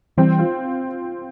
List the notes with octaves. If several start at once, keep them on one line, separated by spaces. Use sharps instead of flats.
E3 G3 C4
F4